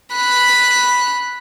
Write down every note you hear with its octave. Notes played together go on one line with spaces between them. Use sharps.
B5 F#6